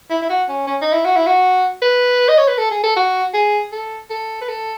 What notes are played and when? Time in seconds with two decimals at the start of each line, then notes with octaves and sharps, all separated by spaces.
0.11 E4
0.22 E4
0.30 F#4
0.49 C#4
0.67 C#4
0.82 D#4
0.93 E4
1.05 F#4
1.17 E4
1.27 F#4
1.82 B4
2.29 D#5
2.38 C#5
2.48 B4
2.58 A4
2.71 G#4
2.84 A4
2.97 F#4
3.34 G#4
3.72 A4
4.10 A4
4.41 B4
4.49 A4